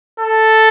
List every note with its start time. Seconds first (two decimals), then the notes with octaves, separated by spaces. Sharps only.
0.20 A4